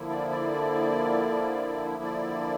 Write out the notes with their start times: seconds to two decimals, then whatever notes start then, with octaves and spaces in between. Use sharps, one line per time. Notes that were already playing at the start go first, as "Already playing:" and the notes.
Already playing: D3 F3 A#3 E4
0.10 D5
0.30 D5
2.03 D5